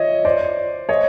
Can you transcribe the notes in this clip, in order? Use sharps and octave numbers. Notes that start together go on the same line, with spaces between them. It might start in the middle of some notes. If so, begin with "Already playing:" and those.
Already playing: C#5 D#5 E5
C5 D5
C#5 D#5